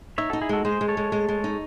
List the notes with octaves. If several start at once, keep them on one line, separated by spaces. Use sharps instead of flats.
D#4 C#5 E5
D#4 F#4 A4
E4 G#4
G#3 F#4 A4
G#3 G#4 C5
G#3
A4 C#5
G#3
G#3
G#3
D#4